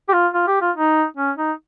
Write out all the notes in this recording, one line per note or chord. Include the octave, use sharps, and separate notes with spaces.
G4
F4
F4
G4
F4
D#4
C#4
D#4